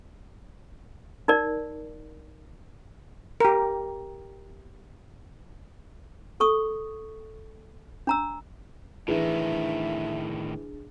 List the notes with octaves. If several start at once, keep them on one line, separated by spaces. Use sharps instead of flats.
D#4 A#4 D5
G4 A#4
A4 C#6 D#6
D4 A#5 E6
A2 D#3 E3 D4 G#4 E5